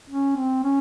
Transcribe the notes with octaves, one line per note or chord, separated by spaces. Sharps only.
C#4
C4
C#4